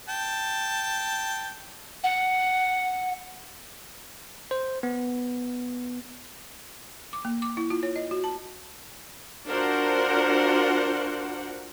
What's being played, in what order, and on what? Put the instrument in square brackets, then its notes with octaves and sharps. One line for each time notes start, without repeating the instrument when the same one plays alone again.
[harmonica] G5 A5
[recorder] F#5
[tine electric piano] C5
B3
[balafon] D6
A#3
D6
E4
F4
C#5
D#5
F#4
A5
[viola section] D4 F4 F#4 A#4 C5 F#5